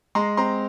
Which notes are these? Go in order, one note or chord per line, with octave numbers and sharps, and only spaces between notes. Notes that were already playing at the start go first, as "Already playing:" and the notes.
G#3 A#5 C6
C4 A#5 C6